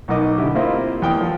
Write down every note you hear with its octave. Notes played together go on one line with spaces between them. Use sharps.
B1 B2 D#4 A#4 D#5 D6
D3 E4 G4
A#3 C4 E4 F4 G4 D#5
E2 G5 D#6
F3